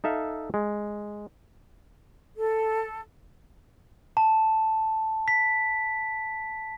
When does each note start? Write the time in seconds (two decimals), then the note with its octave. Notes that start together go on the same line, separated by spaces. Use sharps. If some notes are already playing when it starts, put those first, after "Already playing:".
0.04 D#4 A4 E5 F5
0.54 G#3
2.37 A4
4.17 A5
5.28 B6